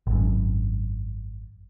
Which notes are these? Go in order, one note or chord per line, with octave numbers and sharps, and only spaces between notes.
G#1 F#2